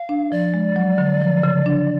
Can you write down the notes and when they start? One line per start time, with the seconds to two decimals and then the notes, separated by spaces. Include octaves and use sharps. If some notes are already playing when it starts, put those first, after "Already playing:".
Already playing: F5
0.09 D4
0.32 F3 D5
0.54 G#3
0.76 F#3
0.98 D3
1.21 F3
1.43 C#3
1.66 D4